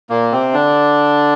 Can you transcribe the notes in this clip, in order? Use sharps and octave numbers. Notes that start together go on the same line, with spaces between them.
A#2 A#3
C3 C4
D3 D4